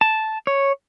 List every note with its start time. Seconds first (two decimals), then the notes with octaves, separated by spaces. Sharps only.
0.01 A5
0.47 C#5